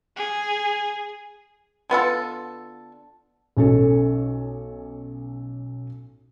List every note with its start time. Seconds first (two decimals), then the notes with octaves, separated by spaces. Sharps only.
0.16 G#4
1.90 D3 B3 F4 A4
3.57 B1 C#4 A4